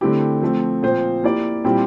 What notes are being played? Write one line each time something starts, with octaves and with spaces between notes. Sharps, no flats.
D3 A3 C4 E4 G4
F3 A3 C4
A#2 F3 C4 F4 C5
A#3 E4 G4 D5
A#2 G3 C4 E4 G4